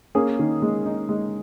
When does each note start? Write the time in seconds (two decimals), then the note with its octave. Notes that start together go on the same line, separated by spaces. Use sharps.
0.15 A#3 C#4 G#4
0.39 D#3
0.62 G#3
0.86 D#4
1.09 G#3